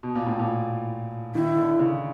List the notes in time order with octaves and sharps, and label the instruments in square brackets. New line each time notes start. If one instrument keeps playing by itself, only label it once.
[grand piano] B2
A#2
A2
A#2
[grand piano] D#3 [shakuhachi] E4
[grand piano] D3
C#3